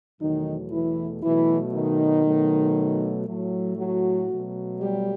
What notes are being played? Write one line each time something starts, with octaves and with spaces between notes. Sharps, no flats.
E2 B2 D#3 F#3 A3 D#4
E3 E4
B2 E3 F#3 A3 E4
D#3 D#4
B2 F#3 A3
A2 F#3 A3
F#3 F#4
B2 F#3 A3
G3 G4